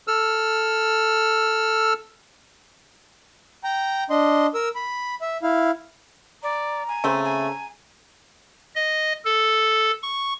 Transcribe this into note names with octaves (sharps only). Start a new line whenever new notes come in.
A4 E6 F6
G5 A#5
D4 D#5 C6
A#4 E6
B5
E5
E4 F5
D5 A#5
G#5
C#3 A3 C4
G#5
D#5
A4
C#6